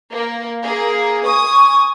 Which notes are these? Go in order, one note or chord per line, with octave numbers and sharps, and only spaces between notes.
A#3
A#3 G#4
G#5 C#6 D#6